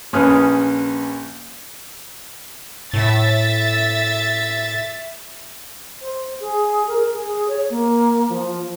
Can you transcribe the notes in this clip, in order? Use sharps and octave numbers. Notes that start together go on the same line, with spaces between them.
A#1 C#4 B4 D#6 F6
A2 E5 A6
C5
G#4
A#4
G#4
C#5
A#3
F3